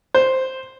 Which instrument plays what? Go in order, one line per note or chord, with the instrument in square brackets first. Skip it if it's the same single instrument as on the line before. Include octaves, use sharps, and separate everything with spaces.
[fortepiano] C5